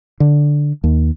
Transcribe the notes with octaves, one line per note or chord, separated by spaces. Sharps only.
D3
D#2